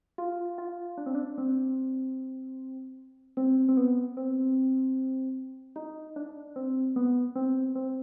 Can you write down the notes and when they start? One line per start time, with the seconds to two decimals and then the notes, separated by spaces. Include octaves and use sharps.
0.18 F4
0.58 F4
0.98 D4
1.06 C4
1.15 D4
1.38 C4
3.37 C4
3.69 C4
3.77 B3
4.17 C4
5.76 D#4
6.16 D4
6.56 C4
6.96 B3
7.36 C4
7.75 C4